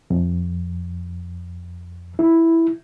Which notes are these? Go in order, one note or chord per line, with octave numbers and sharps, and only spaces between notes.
F2
E4